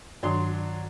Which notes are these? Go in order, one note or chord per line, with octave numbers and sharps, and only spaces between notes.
G2 D#3 F#3 D4 C6